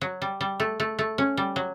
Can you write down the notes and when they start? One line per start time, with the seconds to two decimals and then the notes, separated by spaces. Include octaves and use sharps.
0.01 F#3
0.22 G3
0.41 G3
0.60 A3
0.80 A3
0.99 A3
1.18 C#4
1.37 G3
1.56 F#3